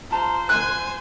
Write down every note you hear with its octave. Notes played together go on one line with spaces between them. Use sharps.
F4 C5 A5 A#5
G#5 F#6